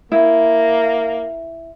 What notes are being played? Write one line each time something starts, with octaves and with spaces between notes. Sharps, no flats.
A#3 E4